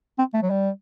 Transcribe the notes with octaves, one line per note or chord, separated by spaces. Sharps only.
C4
A3
F#3
G3